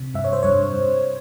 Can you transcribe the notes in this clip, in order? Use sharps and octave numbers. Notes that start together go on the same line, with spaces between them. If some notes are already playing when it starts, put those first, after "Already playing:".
Already playing: C3
G2 E5
C#5
C5
G2 C#5
G2